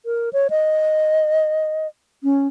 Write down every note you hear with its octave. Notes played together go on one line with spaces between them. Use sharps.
A#4
C#5
D#5
C#4